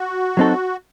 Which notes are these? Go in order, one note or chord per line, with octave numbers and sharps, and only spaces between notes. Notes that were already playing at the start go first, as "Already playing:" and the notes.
Already playing: F#4
F#3 C4 D#4 A4